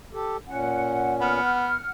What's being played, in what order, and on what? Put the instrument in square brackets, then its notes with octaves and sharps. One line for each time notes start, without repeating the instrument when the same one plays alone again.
[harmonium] G4 A4
[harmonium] A#2 C#4 [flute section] F#5
[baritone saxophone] B3 [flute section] F#5 F6